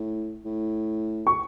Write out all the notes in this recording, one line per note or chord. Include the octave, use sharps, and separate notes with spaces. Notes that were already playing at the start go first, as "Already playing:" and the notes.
Already playing: A2
A2
C#6